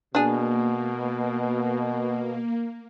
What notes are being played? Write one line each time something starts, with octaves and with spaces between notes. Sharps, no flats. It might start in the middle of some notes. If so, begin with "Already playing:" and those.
B2 A#3 D4 G#4